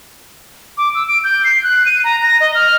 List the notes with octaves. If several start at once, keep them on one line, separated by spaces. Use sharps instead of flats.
D6
E6
D7
G6
C7
F#6
D#7
A#5
A#6
D#5
F6